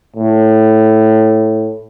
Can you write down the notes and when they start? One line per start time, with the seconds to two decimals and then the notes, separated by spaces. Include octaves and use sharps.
0.16 A2